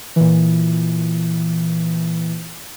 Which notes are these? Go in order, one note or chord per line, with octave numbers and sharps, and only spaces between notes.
A#2 E3